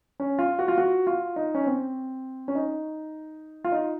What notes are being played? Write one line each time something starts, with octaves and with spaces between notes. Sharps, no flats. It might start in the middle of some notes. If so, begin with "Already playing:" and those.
C#4
F4
F#4
F4
F#4
F4
D#4
C#4
C4
C#4
D#4
F4
D#4